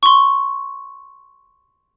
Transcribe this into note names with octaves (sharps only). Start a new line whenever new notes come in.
C6 C#6